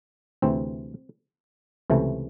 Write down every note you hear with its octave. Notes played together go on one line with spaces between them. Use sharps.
D2 C3 E3 C4
C#2 C3 E3 A3